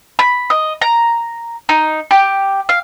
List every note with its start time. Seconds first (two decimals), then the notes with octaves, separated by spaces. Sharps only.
0.19 B5
0.50 D#5
0.82 A#5
1.69 D#4
2.11 G4
2.69 F5